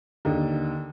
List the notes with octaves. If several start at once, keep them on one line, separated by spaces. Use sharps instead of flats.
D#2 D3 D#4